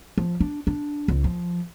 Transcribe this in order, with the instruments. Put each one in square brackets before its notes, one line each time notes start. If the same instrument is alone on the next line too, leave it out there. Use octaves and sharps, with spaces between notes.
[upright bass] F3
D4
D4
C#2
F3